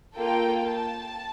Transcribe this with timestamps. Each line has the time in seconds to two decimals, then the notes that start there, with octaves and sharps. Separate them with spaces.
0.16 A#3 F4 A4 G5
0.67 A5